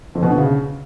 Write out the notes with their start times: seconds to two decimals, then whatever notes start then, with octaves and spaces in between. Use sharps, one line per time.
0.15 F2
0.23 B2
0.30 D3
0.38 C#3